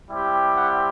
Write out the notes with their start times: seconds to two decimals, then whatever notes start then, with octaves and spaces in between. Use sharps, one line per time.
0.11 G3 C4 E4 G4
0.55 F#5